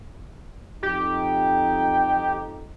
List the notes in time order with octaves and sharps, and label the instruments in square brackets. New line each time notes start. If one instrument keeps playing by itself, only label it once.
[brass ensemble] F2 D#4 [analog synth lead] G4